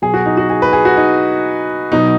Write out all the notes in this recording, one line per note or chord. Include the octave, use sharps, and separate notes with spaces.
B2 F#3 G#4
F#4
D#4
F#4
G#4
B4
G#4
F#4
D#4
B2 F#3 D#4